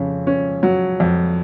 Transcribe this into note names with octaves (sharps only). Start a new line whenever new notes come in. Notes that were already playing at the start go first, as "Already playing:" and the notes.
Already playing: F2 C#3
C#4
F#3
F2